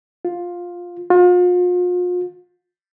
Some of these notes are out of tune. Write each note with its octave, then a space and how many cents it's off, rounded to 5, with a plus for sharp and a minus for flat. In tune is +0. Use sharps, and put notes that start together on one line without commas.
F4 +10
F4 +40